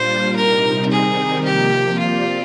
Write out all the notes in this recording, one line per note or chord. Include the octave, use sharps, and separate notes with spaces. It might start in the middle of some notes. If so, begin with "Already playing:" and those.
Already playing: A#2 G3 D4 F4 C5
C3 G3 C4 D#4 A#4
D#3 G3 C4 D#4 G#4 A#4
C3 F3 A#3 G4
C4 F4 G4 D5